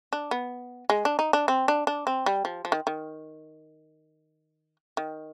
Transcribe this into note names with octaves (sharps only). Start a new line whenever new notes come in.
D4
B3
G#3
D4
D#4
D4
C4
D4
D4
C4
G3
F3
F3
D#3
D#3
D#3